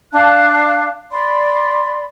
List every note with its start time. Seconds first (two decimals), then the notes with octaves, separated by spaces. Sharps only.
0.12 D4 F5 A5 F#6
1.11 D5 B5 C6